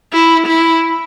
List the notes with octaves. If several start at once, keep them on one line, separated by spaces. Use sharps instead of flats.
E4
E4